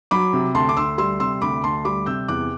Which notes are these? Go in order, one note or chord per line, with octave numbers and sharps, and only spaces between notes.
F#3 B5 D6
C3
D2 A5 C6
D6
D2 C6 E6
G3 C6 E6
C3 C6 E6
D2 B5 D6
D2 A5 C6
G3 B5 D6
C3 E6 G6
E2 D6 F#6